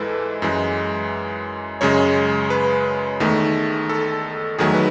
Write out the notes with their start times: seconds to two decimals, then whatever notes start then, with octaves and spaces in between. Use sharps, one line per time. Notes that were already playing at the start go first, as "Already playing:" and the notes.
Already playing: G#2 E3 G#3 A4 B4
0.42 F#2 E3 G#3
1.81 F#2 C#3 G#3 C#5
2.50 B4
3.20 E2 D#3 A3
3.89 A4
4.59 E2 D#3 F#3 A3 G#4
4.74 B4